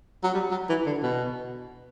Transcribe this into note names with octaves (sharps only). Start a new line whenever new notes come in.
F#3
G3
F#3
E3
D3
B2